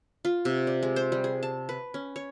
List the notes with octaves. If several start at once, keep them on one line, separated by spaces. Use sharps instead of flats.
F4
C3
D5
G#3
C5
G3
G#4
A5
B4
C#4
C#5